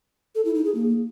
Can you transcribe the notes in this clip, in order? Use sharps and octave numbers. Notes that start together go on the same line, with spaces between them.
A4
E4
D#4
G#4
A#3